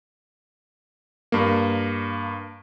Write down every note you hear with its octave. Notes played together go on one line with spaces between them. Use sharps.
G2 A#3